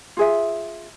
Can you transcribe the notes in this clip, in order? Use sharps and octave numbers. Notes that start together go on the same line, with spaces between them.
F4 G#4 E5